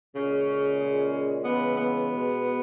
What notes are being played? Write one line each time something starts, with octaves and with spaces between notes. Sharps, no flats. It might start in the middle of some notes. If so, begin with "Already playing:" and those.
A#2 C#3 G#3 C#4
A#2 G#3
C#3 E3 G#3 B3
B3
B2 G#3